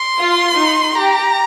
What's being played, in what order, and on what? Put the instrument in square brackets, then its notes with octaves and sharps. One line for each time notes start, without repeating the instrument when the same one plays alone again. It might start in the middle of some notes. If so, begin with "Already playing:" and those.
Already playing: [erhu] C6
[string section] F4
D#4
[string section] G4 [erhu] A#5